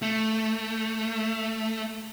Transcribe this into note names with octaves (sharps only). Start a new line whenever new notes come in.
A3